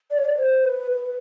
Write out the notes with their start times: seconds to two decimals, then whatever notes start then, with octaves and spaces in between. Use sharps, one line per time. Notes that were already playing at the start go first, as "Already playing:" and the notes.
0.11 D5
0.18 C#5
0.25 D5
0.38 C5
0.65 B4
0.91 B4